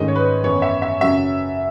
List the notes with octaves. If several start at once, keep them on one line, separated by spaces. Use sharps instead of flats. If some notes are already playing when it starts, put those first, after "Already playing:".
Already playing: G#2 D#3 A3 C#4 D#5
C#5
B4
F#2 E3 B3 C#5
E5
E5
F#2 C#3 F#3 C#4 E5